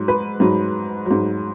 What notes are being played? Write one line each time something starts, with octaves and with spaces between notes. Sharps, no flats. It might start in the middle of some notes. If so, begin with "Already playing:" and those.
Already playing: G#2 F#3
B4
G#2 F#3
G#2 F#3